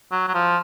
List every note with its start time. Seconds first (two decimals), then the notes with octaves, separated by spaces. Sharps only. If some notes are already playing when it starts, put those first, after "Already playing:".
0.11 F#3
0.28 F#3
0.34 F3